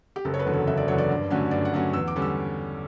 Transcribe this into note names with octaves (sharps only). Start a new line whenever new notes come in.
G4
F#1 A4
C#5
B4
E2 D3 F#3
A4
F#1 E5
D5
E2 D3 F#3 C#5
D5
G2
D3 F#3 A3 C#4
G2 D5
F#5
D3 F#3 A3 C#4
E2 E6
D6
D3 G3 C#4
E6